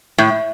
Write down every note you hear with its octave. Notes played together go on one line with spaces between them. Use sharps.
A2